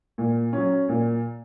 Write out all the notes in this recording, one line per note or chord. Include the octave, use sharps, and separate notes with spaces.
A#2
F#3 C#4
A#2